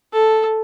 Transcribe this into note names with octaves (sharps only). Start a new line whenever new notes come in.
A4